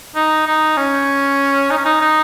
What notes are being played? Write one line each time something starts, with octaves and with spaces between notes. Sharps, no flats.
D#4
D#4
C#4
D#4
C#4
D#4
D#4